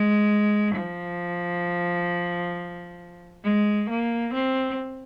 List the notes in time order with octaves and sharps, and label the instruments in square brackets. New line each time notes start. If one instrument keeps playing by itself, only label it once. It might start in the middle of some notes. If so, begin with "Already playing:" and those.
Already playing: [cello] G#3
F3
G#3
A#3
C4